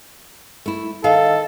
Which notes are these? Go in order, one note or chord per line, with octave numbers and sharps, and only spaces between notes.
A3 E4
D#3 A4 F5